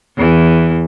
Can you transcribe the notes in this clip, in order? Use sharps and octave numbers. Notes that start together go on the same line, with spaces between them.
E2 E3